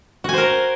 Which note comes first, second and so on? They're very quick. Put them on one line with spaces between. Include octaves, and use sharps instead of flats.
F#4 G#5 C5 A#4